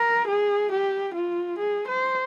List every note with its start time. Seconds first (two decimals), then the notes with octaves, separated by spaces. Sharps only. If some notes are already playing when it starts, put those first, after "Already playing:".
Already playing: A#4
0.27 G#4
0.71 G4
1.14 F4
1.58 G#4
1.87 C5